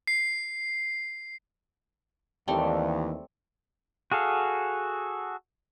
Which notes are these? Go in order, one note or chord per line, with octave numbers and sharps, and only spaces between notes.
C7
D#2 E3 G3 A3 C4
F#4 G#4 A4 F5